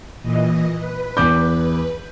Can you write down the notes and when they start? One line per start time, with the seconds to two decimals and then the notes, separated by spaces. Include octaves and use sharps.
0.22 A#2 E3 D#5
0.76 B4
1.17 E2 D6 G6